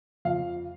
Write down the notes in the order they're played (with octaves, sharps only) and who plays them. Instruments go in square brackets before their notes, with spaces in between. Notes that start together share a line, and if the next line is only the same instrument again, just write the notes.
[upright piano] F2 F5